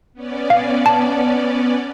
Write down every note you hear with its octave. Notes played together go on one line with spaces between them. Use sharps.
B3 C#4 D5
F5
A5